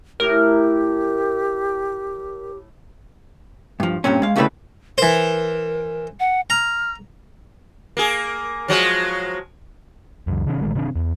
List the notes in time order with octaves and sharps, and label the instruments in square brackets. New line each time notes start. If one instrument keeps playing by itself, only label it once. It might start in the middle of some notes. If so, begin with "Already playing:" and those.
[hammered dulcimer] A2 [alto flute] G4 [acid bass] A#4
[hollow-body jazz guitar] G2 F3
G2 A#2 C4 C#4
G#3 F5
D2 C#3 G3 A3 E4 B4
[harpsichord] E3 C5 [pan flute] A#4
[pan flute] F#5
[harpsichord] A#5 [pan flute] F6
[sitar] A#3 G#4
F3 F#3 G#3
[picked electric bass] C#2 F#2
C3 D#3 C#4
A#1 D#3 G#3 A3
C3 D#3 C4 D4
E2